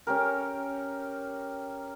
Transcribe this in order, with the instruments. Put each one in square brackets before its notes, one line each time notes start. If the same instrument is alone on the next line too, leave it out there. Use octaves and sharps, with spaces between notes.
[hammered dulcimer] C#4 G4 A#4